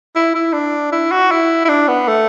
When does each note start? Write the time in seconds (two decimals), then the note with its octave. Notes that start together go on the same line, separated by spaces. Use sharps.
0.15 E4
0.35 E4
0.53 D4
0.92 E4
1.12 F#4
1.31 E4
1.65 E4
1.69 D4
1.88 B3
2.08 A3